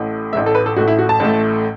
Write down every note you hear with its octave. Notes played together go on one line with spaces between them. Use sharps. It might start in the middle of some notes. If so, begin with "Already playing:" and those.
Already playing: A1 A2 A3
A1 A2 A3 E5
A4
B4
A4
A1 A2 A3 F#4
E4
F#4
A5
A1 A2 A3